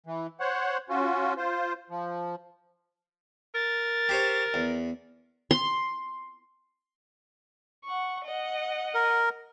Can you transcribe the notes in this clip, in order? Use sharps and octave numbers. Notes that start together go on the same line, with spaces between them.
E3
C5 C#5 F#5
C#4 F4 F#4
F4 C5
F3
A#4 A6
G4 C5 C#5
E2
C6
F#5 C#6
D#5 F#5
A#4